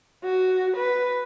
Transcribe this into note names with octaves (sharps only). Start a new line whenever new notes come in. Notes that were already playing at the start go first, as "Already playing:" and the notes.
F#4
B4